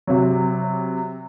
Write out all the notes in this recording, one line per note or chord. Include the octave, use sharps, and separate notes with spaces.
C3 F#3